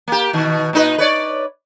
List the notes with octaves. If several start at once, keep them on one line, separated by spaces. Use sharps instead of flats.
A#3 G4
B2 D#3
A#2 D#4 B4
B4 C#5 D5